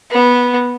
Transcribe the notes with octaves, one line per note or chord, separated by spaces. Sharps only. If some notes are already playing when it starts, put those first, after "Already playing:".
B3